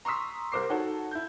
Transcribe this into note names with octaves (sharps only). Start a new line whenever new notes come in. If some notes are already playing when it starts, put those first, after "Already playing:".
A#5 C6 C#6 D#6 E6 B6
C2 A#4 C5 D6 C7
D#4 F#4 A4 C#5 F#5 A5
E4 G6